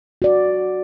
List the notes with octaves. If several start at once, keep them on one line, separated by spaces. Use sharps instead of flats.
F#4 D5